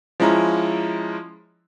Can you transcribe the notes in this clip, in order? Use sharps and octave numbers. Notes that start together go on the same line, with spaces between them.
F3 G#3 C#4 E4 A#5